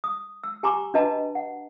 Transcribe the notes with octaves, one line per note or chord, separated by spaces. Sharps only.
D#6
E6
G4 G#5 A#5 C6 D6
D4 F#4 B4 D#5 A5 A#5
F#5